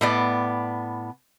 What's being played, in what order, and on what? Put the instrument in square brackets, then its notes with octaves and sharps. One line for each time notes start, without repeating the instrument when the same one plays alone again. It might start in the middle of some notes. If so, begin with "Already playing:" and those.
[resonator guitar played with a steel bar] A2 B3 D5